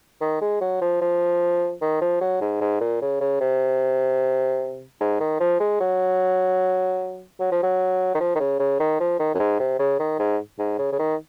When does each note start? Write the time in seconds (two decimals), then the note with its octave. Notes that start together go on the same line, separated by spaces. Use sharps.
0.21 D#3
0.41 G#3
0.61 F#3
0.81 F3
1.01 F3
1.81 D#3
2.01 F3
2.21 F#3
2.41 G#2
2.61 G#2
2.81 A#2
3.01 C#3
3.20 C#3
3.41 C3
5.00 G#2
5.20 D#3
5.40 F3
5.60 G#3
5.80 F#3
7.40 F#3
7.52 F3
7.63 F#3
8.15 D#3
8.20 F3
8.35 D#3
8.39 C#3
8.59 C#3
8.80 D#3
9.00 F3
9.19 D#3
9.34 F#2
9.39 G#2
9.59 C3
9.79 C#3
9.99 D#3
10.19 G#2
10.59 G#2
10.79 C#3
10.92 C#3
10.99 D#3